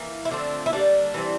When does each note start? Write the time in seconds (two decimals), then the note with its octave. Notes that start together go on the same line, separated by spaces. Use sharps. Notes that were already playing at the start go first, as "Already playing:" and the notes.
Already playing: E3 A#3
0.25 E4
0.31 D3 F3 A3 C4 D4
0.66 E4
0.72 D3 G3 A#3 D4
1.14 E3 G3 C4